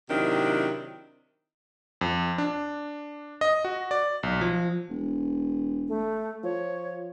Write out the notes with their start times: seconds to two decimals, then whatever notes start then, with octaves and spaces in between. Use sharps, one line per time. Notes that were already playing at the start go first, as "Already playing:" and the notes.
0.09 C3 D#3 F#3 D4 E4
2.01 F2
2.38 D4
3.41 D#5
3.65 F#4
3.91 D5
4.23 B1
4.41 F3
4.90 E1
5.88 A3
6.44 F3 C#5